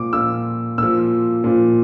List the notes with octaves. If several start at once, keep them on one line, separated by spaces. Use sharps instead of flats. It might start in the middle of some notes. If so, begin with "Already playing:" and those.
Already playing: A#2 F3 D6
A#2 F3 E6
A#2 F3 E6
A#2 F3